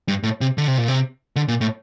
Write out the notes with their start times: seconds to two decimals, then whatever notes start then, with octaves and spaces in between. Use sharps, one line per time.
0.08 G2
0.23 A2
0.41 C3
0.58 D3
0.68 C3
0.78 A#2
0.88 C3
1.36 D3
1.48 A#2
1.61 A2